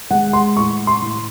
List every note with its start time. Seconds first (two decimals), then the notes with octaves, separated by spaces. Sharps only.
0.11 G#3 F#5
0.33 C6
0.57 A2 C#6
0.87 C6
1.02 A2